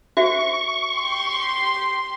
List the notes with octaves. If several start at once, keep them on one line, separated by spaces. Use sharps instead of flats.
F#4 C5 E5 C#6
G4 C6